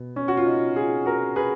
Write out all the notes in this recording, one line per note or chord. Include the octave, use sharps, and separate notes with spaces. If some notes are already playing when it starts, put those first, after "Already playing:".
Already playing: B2
C#4
F#4
F4
D#4
F4 G#4
F#4 A#4
G#4 B4